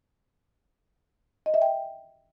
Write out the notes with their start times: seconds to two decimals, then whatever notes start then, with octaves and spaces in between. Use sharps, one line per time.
1.46 D#5
1.54 E5
1.62 G5